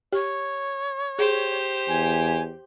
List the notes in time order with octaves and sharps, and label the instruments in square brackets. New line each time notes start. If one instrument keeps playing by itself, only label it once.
[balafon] G4 [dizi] C#5
[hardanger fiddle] G4 C5 [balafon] G#4
[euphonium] E2 [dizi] G#5